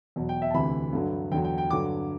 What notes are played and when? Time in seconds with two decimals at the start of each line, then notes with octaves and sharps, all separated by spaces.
0.16 E2 B2 F#3
0.29 G5
0.42 E5
0.51 A5
0.54 D2 C3 E3 B5
0.93 G2 D3 F#3
1.32 E2 D3 F#3 G5
1.45 G5
1.58 G5
1.70 G2 D3 F#3 D6